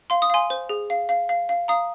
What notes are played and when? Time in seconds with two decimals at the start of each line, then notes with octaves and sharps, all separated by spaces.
0.10 F5 C6
0.22 D#6
0.30 F5 G#5 C6
0.50 C5
0.69 G#4
0.90 F5
1.09 F5
1.29 F5
1.49 F5
1.68 F5 A#5 D#6